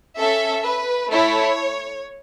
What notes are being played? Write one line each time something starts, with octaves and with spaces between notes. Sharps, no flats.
C#4 A4 E5
B4
A3 E4 A4 C#5